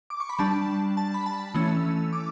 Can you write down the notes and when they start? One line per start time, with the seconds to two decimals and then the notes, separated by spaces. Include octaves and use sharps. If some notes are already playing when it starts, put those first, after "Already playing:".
0.10 D6
0.20 C#6
0.29 B5
0.39 G3 D4 A5
0.97 A5
1.14 B5
1.26 A5
1.54 E3 A3 C#4 E6
2.13 D6